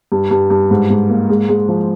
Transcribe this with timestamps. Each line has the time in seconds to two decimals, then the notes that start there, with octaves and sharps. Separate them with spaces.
0.12 G2
0.31 G2
0.50 G2
0.71 G#2
0.90 G#2
1.09 A#3
1.30 G#3
1.49 G#3
1.69 F3